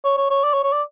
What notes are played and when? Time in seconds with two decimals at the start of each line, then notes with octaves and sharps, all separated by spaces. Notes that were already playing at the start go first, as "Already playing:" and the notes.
0.05 C#5
0.17 C#5
0.30 C#5
0.44 D5
0.53 C#5
0.64 C#5
0.73 D5